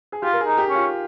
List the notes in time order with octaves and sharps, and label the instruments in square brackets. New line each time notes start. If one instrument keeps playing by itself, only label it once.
[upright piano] G#4
[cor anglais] F4 [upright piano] G4
[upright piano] A#4
G#4
[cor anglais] D#4
[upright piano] G4
[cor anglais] C#4
[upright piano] F4